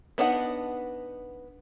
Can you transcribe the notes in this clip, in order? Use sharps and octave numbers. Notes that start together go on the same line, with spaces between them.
B3 D4 D#4 F#5